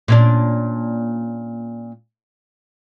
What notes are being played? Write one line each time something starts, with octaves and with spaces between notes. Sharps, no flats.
A#2 C#4 D4